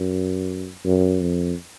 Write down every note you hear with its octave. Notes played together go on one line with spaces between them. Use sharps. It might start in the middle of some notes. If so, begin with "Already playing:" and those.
Already playing: F#2
F#2
F2